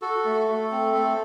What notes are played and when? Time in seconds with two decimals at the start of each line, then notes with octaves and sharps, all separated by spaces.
0.02 F#4 A4
0.25 A3
0.48 A3
0.71 C4
0.94 A3